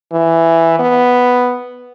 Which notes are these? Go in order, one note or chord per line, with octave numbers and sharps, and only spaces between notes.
E3
B3